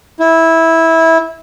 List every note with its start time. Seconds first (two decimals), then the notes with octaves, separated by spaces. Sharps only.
0.20 E4